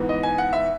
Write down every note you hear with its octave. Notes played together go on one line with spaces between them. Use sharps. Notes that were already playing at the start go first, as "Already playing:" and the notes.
Already playing: G#2 E3 B3
D#5
G#5
F#5
E5